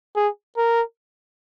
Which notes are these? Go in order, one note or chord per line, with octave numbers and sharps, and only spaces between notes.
G#4
A#4